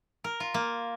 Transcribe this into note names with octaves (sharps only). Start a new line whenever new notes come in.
A#4
F4
A#3